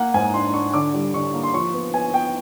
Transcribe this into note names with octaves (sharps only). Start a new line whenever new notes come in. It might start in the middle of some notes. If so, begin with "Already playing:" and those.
Already playing: A#3 F#5
G#2 G#5
D4 C6
D4 C#6
D3 D6
G3
D3 C#6
A#3
C6
F3 C#6
B3
B3 G#5
B3 G5